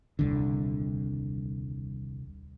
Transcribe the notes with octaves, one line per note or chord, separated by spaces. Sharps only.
D#1 C2 D3